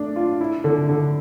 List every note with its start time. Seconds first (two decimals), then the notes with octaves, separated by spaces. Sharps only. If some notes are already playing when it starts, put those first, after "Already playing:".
Already playing: A3 D4
0.16 F4
0.41 E4
0.64 D3
0.89 D3